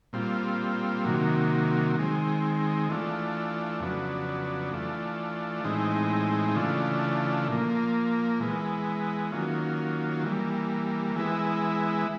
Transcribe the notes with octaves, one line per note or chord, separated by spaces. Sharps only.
A#2 G3 C4 F4
C3 D#3 F#3 A#3
D#3 G#3 C4
E3 A3 D4 F4
F2 C#3 F#3 B3 D4
E3 A3 D4 F4
A2 E3 G#3 C4 D#4
C#3 E3 A3 D4 F4
A#2 F3 A#3
E3 G#3 B3
D#3 F#3 A#3 C#4 F4
E3 G3 A#3
E3 G#3 B3 E4